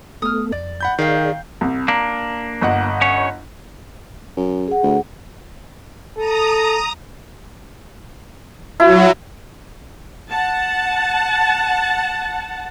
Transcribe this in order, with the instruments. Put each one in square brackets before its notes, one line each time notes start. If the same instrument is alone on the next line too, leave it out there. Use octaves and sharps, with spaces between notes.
[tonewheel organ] A3 B3 A4 [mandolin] D#6 F6
[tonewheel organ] F2 [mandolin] D5
[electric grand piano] F#5 B5 G6
[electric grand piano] D#3 [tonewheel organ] G#4 D5 [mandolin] F5 G5
[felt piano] C2
[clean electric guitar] A#3 D4 [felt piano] A#5
[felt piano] G1 D#5 F#5
[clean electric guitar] C#4 C#5
[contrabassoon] F#2
[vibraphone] G#4 F#5
[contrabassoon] D2
[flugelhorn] A4 [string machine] A#5 D#6
[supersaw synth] F#3 [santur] E4
[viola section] F#5 A5